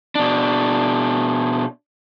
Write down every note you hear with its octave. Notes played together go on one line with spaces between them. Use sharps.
B2 D4